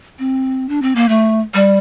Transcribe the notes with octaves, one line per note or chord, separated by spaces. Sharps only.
C4
D4
C4
A#3
A3
G3